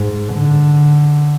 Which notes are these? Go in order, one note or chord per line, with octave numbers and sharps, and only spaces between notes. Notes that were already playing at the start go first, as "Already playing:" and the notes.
Already playing: G#2
D3